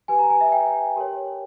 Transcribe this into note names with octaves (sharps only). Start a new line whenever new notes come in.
G4 B4 G#5
A#5
G#5
E5
G5
G4 A#4 C#5